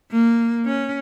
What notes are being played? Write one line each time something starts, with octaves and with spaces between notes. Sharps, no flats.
A#3
C#4